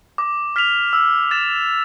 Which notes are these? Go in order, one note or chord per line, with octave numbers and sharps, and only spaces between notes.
D6
F6 B6 F7
E6
A6 E7